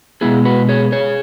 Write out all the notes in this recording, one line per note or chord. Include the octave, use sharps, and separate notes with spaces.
B2 G#3 B3 E4 G#4
F#4 B4
G#4 C#5
G#4 C#5